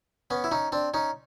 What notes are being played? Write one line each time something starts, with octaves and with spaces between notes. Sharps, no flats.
B3 C#4
E4
C#4 D#4
C4 D4
C#4 D#4